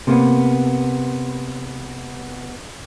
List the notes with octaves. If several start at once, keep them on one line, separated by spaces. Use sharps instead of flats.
C3 A#3 B3